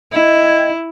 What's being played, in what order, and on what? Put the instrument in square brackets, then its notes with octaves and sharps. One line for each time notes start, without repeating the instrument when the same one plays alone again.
[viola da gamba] E4 [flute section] D#5 G5 G#6